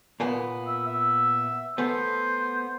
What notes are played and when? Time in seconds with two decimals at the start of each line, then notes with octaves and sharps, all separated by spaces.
0.20 A#2 A#3 B3
0.67 E5
0.87 E5
1.78 A3 B3 C5